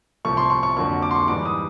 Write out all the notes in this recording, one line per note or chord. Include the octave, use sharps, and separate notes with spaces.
C2 C3 F3 A3 C#6
C6
C#6
C#6
F2 D3 F#3 A#3 C#6
D6
C6
C#6
G#2 E3 G3 D6
D#6